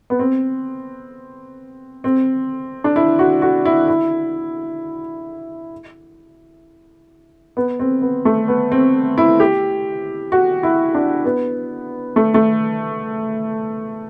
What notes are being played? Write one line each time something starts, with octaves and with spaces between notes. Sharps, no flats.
B3
C4
C4
D4
E4
F#4
F#4
E4
E4
B3
C4
B3
A3
B3
C4
E4
G4
F#4
E4
D4
B3
A3
A3